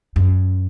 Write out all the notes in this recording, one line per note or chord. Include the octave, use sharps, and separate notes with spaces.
F#2